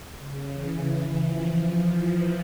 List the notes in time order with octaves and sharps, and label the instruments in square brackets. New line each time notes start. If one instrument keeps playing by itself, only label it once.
[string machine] C#3
E3
F3
F3
E3